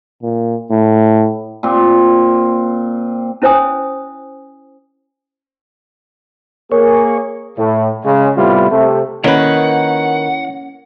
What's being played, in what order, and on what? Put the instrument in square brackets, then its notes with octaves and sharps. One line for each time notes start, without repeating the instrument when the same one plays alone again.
[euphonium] A#2
A2
[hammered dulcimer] A#2 C4
[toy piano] C#4 E4 C5 C#5 G#5 D#6
[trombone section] A#3 G#4 [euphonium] A#4 [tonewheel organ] C#5
[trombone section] A2
C#3 G#3
A2 C3 G3 B3 E4 F4
C3 A3
[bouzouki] D#3 B4 [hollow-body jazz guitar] A#3 C#4 [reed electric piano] E4 C#5 [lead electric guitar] F#5